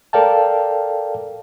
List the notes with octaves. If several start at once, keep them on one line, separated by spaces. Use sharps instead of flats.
A4 A#4 D5 F5 G5 A5